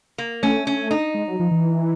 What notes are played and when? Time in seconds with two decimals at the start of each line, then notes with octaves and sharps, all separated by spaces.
0.18 A#3
0.43 A3 C#4
0.67 C#4
0.91 D#4
1.14 G#3
1.28 F#3
1.40 F3
1.51 E3